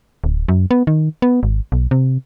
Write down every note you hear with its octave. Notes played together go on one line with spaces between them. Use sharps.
D1
F#2
B3
D#3
B3
G#1
B1
C3